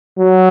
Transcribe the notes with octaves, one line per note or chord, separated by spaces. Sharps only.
F#3